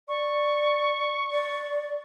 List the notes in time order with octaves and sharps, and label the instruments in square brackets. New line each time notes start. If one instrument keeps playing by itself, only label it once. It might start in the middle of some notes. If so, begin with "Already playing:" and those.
[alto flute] D5 [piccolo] C#6
[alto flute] D5